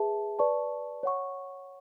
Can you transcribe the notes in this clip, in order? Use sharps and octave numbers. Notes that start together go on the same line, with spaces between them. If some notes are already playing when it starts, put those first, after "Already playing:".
Already playing: G#4 B4 E5 A5
B4 D5 A5 C#6
C#5 F#5 C#6